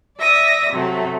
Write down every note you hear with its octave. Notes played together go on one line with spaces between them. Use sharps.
D5 E5 D#6 A#6
C3 F#3 A3